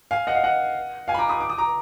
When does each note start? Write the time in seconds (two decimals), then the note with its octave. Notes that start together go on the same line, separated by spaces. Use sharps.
0.11 F5 G#5
0.27 D#5 F#5
0.35 F5
0.44 D#5 F#5
1.08 F5 G#5
1.14 B5
1.19 A#5 D6
1.29 B5 D#6
1.40 D6
1.50 D#6
1.58 A#5 D6